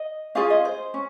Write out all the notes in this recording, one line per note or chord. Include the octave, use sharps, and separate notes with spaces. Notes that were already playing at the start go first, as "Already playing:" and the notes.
Already playing: D#5
C#4 F4 G#4 F5
D#5
C5
C#4